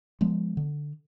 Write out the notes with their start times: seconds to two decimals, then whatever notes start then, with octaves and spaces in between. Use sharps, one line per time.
0.21 F3 G#3 B3
0.57 D3